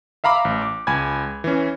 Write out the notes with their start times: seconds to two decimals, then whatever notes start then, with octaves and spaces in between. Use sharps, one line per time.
0.24 E5 F5 A#5 B5 D6
0.45 A1
0.62 D6
0.87 C#2 G#5 B5 G#6
1.44 E3 C#4